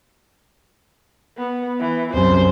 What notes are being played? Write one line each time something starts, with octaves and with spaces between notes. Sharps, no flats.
B3
E3
C2 F#2 C5